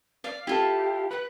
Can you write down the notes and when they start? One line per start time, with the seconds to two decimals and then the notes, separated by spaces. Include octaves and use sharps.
0.24 D5 F5
0.47 E4 F4 G4 A4
1.11 B4 F#6